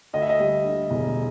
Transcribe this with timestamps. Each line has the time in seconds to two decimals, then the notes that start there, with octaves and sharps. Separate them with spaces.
0.13 D2 D#5
0.21 E5
0.29 D#5
0.40 G3
0.65 D3
0.91 E1